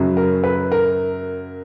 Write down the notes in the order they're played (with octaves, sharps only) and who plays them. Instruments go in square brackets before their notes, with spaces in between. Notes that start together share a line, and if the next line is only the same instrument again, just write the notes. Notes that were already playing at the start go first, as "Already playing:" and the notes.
Already playing: [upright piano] F#2 C#3 F#3
A#4
B4
A#4